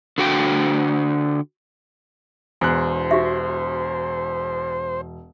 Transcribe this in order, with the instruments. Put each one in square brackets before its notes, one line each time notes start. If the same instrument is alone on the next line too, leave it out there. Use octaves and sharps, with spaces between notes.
[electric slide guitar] D3 F#4 G5
[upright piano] E1 [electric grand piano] E2 F#6 [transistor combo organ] C5 [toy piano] G#5
[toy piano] F#4 G4 E5